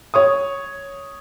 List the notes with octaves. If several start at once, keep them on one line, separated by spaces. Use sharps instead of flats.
C#5 C#6 D#6